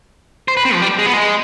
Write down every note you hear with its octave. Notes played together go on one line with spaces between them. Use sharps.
C5
B4
C4
F3
G3
G#3
B3
G#3